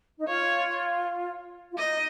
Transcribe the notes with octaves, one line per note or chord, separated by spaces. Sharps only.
D#4
F4 C#5
F4
D#4 D#5